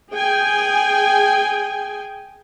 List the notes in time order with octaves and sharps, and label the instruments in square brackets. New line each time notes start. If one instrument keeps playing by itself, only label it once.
[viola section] G#4 G5 G#5